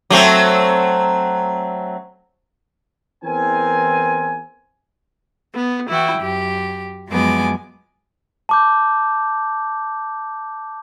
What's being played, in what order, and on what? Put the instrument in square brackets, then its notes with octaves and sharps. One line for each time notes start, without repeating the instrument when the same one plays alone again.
[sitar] F#3 A3 C4
[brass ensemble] E2 E3 C4 A#4 G#5
[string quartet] B3
E3 E4 F#4 G5
F#2 G4
F#2 F3 G#3 B3 G#5 D6
[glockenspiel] A5 D6 G6